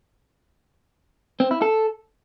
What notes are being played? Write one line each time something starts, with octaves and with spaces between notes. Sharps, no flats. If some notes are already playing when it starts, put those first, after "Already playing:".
C4
E4
A4